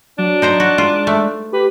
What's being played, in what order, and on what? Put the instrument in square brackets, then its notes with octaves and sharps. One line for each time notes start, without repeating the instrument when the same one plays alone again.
[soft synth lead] F#3 [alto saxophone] D4
[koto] D#4 C5 A#5
F#4
[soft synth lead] G#3 [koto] F4
[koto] A3
[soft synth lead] G4 [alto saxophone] B4